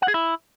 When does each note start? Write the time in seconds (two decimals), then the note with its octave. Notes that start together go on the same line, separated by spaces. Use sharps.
0.02 F#5
0.08 G#4
0.14 E4